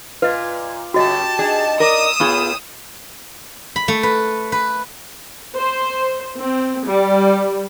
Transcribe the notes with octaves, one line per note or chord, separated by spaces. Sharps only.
A#2 F4 B4 D#5
F#2 C#3 B3 F#4 G4 D#5 A5
D4 D#4 G#4
A#4 D5 D#6 E6
A2 B3 F4 G#4 C#6
B5
A3
B4
B4
C5
C4
G3